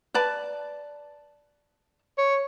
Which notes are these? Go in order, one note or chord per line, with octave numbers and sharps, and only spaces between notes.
B4 D5 A5
C#5